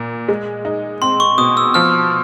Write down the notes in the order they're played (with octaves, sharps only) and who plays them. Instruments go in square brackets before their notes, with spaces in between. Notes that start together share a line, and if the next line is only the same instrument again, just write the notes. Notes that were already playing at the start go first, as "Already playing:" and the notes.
Already playing: [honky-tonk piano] A#2
G#3
D#4
[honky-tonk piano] C4 [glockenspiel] C6
[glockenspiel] C#6
[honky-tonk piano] B2 [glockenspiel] D#6
[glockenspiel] E6
[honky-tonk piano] F3 [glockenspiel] F6